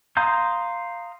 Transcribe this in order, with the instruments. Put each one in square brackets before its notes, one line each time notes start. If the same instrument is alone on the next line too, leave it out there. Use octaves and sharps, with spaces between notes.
[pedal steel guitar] F5 A#5 C6 D#6 G6